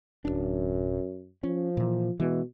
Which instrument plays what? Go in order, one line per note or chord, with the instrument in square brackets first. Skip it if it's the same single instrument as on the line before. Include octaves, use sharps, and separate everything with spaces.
[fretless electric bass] D1 G#1 D4 [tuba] F#2
[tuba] F3 [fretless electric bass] C#4
[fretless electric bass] A#2 E3
[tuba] B2 [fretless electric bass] E3 G#3